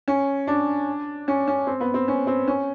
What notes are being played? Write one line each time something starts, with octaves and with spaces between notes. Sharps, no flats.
C#4
D4
C#4
C#4
C4
B3
C4
C#4
C4
C#4